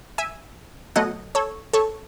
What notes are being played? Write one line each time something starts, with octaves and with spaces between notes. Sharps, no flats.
E5 G#5
B2 F#3 A3 D#5 F#5
A4 C#5
A4 C#5